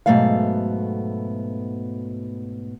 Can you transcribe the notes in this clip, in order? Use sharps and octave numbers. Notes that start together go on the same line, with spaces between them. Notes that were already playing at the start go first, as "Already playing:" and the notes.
G#2 B2 F#3 A3 B3 F5